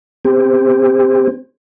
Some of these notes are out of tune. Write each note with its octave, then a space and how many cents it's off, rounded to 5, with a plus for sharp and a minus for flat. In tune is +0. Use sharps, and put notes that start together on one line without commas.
C4 -15 G4 +25